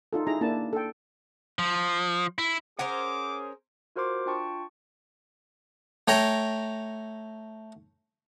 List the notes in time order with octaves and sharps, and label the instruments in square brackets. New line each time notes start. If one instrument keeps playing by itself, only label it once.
[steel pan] D#4 F4 A4
D#4 E4 G#4 A#5
A#3 D4 E4 A5
A4 G5
[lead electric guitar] F3
E4
[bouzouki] C#4 A#4 C5 [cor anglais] G#4 [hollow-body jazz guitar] F#5 [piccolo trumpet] D6
[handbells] F4 F#4 A#4 C5 C6 D6
D4 F4 G5 A5 C#6
[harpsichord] A3 C#5 G5 A#5